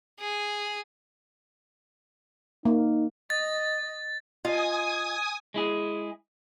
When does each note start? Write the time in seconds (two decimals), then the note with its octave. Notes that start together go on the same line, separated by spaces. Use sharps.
0.19 G#4
2.65 A#3 D#4
3.30 D#5 A6
4.45 F4 D#5 G#5 D#6
5.54 G#3 E4 G#4